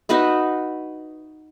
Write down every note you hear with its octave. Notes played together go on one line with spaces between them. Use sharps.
D#4 F#4 B4 E5